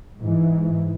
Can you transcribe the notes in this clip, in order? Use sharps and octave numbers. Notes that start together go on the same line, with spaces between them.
G#2 E3